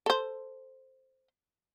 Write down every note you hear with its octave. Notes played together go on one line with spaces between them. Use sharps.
A4 C5